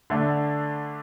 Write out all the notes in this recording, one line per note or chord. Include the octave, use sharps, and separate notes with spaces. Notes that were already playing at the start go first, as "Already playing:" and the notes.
D3 A3 D4